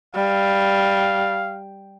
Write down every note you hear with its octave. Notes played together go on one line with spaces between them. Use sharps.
G3 F5